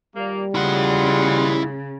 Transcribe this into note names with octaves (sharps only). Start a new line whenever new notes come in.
D#2 A#2 G3 A#3
A2 C#3 G#3 E4 F4 F#5